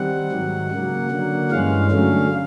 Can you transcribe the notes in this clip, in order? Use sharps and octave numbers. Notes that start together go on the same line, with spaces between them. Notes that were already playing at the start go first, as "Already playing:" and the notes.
Already playing: D#3 G3 C4 F#5
G#2 D#3 F#3
C#3 F#3 A#3
D3 F#3 A#3
G2 E3 G#3 C#4 F5
D3 F#3 A3 C#4